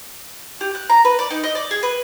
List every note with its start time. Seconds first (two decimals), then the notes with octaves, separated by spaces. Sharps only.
0.61 G4
0.75 F#6
0.90 A#5
1.05 B4
1.19 D5
1.30 D#4
1.44 D#5
1.55 D5
1.71 G#4
1.83 B4